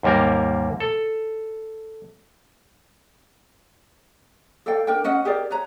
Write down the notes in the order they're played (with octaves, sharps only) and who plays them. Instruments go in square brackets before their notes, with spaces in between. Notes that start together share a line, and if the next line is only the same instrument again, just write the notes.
[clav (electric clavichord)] D#2 G#2 G3 A#3 A#4
A4
[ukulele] A4 D5 F5 G5
D4 A#4 G5
C#4 D#5 F#5
G4 G#4 A#4 D5
B4 C#5 A#5